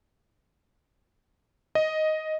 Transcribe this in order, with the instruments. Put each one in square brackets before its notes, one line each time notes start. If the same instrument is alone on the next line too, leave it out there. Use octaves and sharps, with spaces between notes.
[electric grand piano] D#5